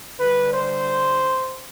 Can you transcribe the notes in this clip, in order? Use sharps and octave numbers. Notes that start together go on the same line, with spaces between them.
D3 G3 B4
C5